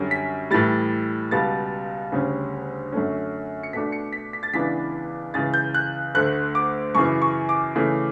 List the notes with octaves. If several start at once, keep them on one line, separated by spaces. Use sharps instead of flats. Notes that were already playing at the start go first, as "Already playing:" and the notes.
Already playing: F#2 D3 G3 C#4
B6
A2 E3 G3 A6
C#2 B2 G3 A6
D2 C#3 G3 C#4
F#2 D3 A3 C#4
C#7
B2 A3 D4 B6
C#7
B6
B6
A6
C#2 C#3 E3 B3 D4 B6
C#2 C#3 E3 A6
G6
F#6
D2 D3 A3 F#6
D6
F#2 C#3 E3 C#6
C#6
D6
C#3 E3 A3 C#4